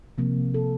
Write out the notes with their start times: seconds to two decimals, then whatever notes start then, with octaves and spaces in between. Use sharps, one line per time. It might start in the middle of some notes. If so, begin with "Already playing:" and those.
0.18 C3 F3 A#3
0.54 A4